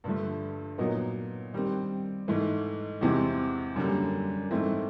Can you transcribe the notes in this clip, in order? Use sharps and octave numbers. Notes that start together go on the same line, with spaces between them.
G2 D3 F3 A3
A#2 F#3 B3 D#4
D#3 G3 C4
G#2 E3 A3
E2 C3 E3 G#3 C4
F#2 D3 G3 A#3
G#2 E3 A3 C4